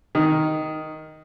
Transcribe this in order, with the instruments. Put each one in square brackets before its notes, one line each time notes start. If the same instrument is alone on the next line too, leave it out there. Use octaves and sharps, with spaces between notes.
[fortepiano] D#3